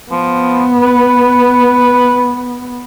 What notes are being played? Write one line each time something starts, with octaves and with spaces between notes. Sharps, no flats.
F3 B3
B4